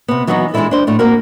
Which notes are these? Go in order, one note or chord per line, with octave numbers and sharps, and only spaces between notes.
C3 B3
E3 F#3 G3 B3 D#4 F#4
E3 G#3 A#3 D4 E4 A4
D4 C5
A2 A3 D4
A#3 C4 F#4 A#4